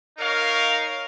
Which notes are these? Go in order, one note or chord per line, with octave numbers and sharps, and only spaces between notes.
D#4 A#4 C#5 F5